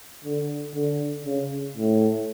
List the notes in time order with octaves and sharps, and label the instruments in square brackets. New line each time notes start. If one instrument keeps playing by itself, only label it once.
[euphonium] D3
D3
C#3
A2